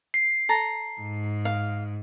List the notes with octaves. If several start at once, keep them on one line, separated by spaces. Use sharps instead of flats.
C7
A4 A#5
G#2
F5